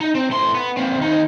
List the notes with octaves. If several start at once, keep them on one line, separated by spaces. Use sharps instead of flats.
D#4
C4
A2 C6
B3
A#3 C4
D#2 D#4